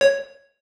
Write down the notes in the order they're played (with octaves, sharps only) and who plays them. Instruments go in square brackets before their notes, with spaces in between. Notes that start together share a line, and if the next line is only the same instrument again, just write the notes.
[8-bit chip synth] C#5